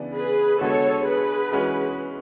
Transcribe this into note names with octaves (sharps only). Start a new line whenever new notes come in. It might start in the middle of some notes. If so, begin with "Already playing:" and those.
Already playing: C#3 E3 B3 D4
G#4 B4
D3 G#3 B3 F#4 A4 C#5
G#4 B4
E3 G#3 C#4 F#4